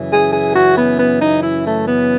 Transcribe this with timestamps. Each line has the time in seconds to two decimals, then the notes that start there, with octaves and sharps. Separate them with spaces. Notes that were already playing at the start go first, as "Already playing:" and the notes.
Already playing: F#2 C#3 E3
0.11 G#4
0.33 G#4
0.55 F#4
0.77 B3
0.99 B3
1.21 D#4
1.43 E4
1.65 A3
1.87 B3